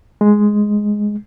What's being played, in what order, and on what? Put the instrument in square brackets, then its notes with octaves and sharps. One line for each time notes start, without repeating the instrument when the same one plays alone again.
[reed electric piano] G#3